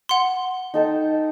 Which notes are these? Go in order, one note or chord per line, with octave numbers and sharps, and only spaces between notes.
F#5 C6
D#4 A4 G5